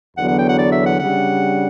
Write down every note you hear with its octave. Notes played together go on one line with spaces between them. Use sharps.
E2 D3 F#3 B3 F#5
F#5
G5
F#5
D5
E5
F#5
C#3 G3 D4 F#5